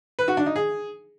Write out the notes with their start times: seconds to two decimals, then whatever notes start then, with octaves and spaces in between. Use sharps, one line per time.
0.19 B4
0.28 F#4
0.37 D4
0.46 D#4
0.56 G#4